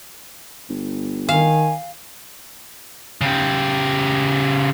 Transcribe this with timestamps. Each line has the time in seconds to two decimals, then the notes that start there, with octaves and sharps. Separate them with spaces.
0.69 G1
1.29 D#3 F5 G#5
3.21 C#3 G4